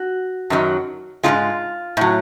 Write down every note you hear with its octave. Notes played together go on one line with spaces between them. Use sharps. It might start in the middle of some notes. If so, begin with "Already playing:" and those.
Already playing: F#4
F#2 D#3 F#3
G#2 D#3 G#3 F4
A2 F#3